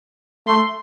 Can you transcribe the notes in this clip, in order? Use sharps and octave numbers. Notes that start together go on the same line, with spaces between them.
A3 C6